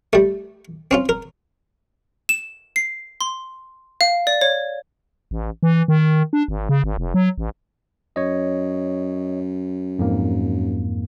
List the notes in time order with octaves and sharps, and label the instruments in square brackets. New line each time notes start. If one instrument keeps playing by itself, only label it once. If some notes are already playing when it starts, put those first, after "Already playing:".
[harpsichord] G3 A3
C4 C#4 F4
A#4
[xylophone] E7
C7
C6
F5
D5
C#5
[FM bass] A1
E3
D#3
D4
G#1
C#3
G#1
F1
F#3
A1
[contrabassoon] F#2 [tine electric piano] C#5 D#5
[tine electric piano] F2 G#2 A#3